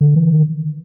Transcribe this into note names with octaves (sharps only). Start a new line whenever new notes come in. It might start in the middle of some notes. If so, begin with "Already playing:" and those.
D3
E3
D#3